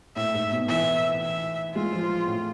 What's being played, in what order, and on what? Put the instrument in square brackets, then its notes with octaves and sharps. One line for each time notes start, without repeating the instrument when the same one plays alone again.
[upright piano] A2 [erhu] E5
[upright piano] G#2
B2
[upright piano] E3 [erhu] E5
[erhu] E5
[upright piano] G#3 [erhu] F4
[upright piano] F3
A2